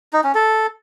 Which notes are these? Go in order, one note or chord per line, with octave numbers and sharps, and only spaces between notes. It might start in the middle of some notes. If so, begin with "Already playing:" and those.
D#4
C#4
A4